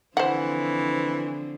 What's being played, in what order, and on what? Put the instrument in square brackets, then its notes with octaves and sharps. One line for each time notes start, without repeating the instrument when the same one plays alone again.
[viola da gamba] D3 F3 C4 [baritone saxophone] E3 [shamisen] C5 F#5